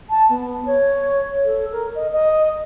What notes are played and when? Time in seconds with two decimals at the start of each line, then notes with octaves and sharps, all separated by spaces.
0.10 A5
0.29 B3
0.65 C#5
1.44 A4
1.72 A#4
1.95 D#5
2.12 D#5